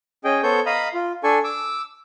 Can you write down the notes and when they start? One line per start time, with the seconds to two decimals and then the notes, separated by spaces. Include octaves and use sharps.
0.24 C#4 G#4 D#5 G5
0.43 B3 A4 C5 C#5 C#6 G6
0.66 D#5 F5 A#5 B5 D#6
0.94 F4
1.24 D4 A4 G#5 C#6
1.44 D6 E6